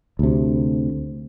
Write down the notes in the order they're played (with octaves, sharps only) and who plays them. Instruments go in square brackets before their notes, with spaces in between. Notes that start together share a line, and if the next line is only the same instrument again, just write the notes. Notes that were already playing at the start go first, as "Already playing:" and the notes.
[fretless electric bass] D2 C3